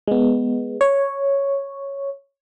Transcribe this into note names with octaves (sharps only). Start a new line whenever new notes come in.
G#3 B3
C#5